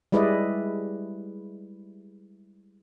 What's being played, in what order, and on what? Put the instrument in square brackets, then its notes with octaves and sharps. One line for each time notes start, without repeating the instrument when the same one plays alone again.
[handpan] G3 G#3 E4 B4 D5 D#5